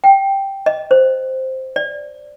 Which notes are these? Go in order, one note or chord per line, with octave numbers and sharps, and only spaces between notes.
G5
D#5
C5
D5